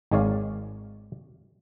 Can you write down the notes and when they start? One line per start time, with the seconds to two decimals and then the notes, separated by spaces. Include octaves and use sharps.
0.11 G#1 D#3 G#3 C#5 D5 F5